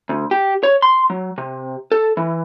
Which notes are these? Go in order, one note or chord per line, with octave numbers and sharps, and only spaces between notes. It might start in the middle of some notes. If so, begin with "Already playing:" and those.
D2
G4
C#5
C6
F#3
C3
A4
E3